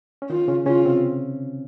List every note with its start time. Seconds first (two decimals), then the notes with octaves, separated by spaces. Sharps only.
0.22 C#4
0.29 D#3 D#4 F4
0.48 C#3 C#4
0.66 C#3 C#4 F4
0.85 C3 C4